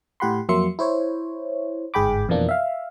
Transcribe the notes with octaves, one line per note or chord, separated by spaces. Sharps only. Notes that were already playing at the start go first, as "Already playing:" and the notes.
A2 G4 F#5 B5 C6
F2 F#3 A#3 E5 C6 C#7
E4 C5 C#5
G1 G#2 G#4 G5 B5 D6
F2 B2 E3 F3 A#3 D4
E5 F5